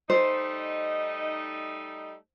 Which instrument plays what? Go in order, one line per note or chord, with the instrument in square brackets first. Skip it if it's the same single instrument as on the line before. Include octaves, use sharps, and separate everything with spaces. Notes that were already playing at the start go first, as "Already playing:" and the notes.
[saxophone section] G3 A3 D#4 [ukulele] C5